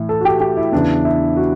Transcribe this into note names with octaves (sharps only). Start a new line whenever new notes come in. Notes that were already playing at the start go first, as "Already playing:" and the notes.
Already playing: A2 E3
A4
F#4
G4
G4
E4
E2 C#3 E3 D4
E4
F#4